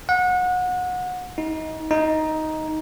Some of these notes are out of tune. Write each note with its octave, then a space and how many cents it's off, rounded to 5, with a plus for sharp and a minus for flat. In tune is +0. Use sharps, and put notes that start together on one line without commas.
F#5 -30
D#4 +25
D#4 +10